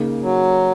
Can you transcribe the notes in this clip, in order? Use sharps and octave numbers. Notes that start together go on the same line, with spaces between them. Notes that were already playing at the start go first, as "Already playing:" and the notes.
Already playing: C#3 A#3 D#4
F#3